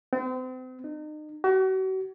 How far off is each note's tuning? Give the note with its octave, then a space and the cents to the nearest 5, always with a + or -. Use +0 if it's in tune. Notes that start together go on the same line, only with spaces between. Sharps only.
C4 -35
D#4 -35
F#4 +40